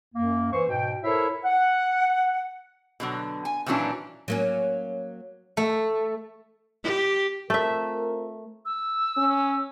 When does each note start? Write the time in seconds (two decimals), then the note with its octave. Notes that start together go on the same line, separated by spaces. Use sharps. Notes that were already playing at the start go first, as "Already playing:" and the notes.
0.15 F#2 A#3
0.52 E3 C5 C#6
0.69 G#2 B2 G5
1.03 E4 A4 A#4 C5 C#5 E5
1.44 F#5
3.00 B2 D3 F#3
3.45 G#5
3.66 A#2 D#3 E3 F#3 C#4 D4
4.28 F#3 A#3 C#4
5.57 A3
6.84 G4
7.50 A3 C4 F4 A#4 E5
8.65 E6
9.17 C#4